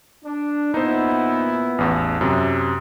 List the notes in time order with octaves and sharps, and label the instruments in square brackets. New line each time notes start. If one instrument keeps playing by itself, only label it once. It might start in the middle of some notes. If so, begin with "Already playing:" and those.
[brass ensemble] D4
[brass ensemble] A#2 B3 E4 [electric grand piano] D#4 C5
[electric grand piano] A1 E2
F#2 C3